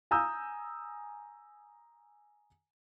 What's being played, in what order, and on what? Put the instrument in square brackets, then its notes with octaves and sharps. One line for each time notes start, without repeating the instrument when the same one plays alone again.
[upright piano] G#5 A#5 D#6 E6 G6